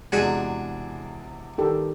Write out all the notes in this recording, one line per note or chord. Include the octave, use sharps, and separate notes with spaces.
E2 C3 G#3 D4 F#4 G#4
D#3 G4 A4